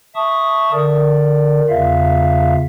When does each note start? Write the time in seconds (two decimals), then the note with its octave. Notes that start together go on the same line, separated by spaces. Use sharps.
0.15 E5 A5 C#6 D#6
0.73 D3 A#4 D5
1.69 E2 C#3 F4 E5 F5